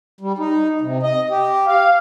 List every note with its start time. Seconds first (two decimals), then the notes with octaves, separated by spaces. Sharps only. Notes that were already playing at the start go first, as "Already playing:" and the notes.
0.21 G3
0.38 D#4
0.81 C3
1.03 D#5
1.30 G4
1.67 F5